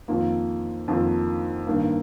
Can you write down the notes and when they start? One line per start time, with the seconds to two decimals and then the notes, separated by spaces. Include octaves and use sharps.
0.08 F2 D#3 A#3 F4
0.88 F2 D#3 A#3 F4
1.67 G2 D#3 A#3